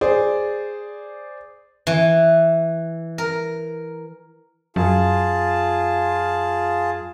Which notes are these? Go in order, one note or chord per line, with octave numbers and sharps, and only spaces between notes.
G#4 C5 D5
E3
A#4
F#2 F4 G#4 A5